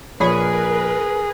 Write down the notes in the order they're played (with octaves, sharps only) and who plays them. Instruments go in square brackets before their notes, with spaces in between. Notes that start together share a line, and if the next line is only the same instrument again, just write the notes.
[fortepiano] A#1 C#5 B5 [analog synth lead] G#4 [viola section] A#4 B4